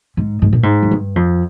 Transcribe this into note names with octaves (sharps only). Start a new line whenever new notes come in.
G#2
G#2
A#2
G#2
F2
G2
F2